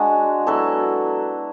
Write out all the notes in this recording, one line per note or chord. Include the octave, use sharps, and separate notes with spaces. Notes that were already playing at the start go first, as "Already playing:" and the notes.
Already playing: G#3 D4 F#4
F#3 B3 E4 A4